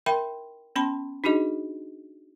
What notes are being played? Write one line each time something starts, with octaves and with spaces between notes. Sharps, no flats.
A#4 E5 G5 B5 C6
B3 C#4 A5 B5 C6
D4 D#4 F#4 G#4 D#5